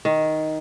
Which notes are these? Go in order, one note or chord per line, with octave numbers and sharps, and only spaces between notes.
D#3